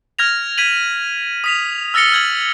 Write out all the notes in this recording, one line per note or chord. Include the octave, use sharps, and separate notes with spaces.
F6 G#6 A#6 F7
G#6 B6 D#7 F#7
D#6 B6 F7
E6 F6 A6 A#6 C#7 G7
F6 G#6 F#7